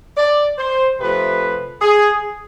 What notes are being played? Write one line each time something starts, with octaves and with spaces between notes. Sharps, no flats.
D5
C5
C3 F3 A3 B4
G#4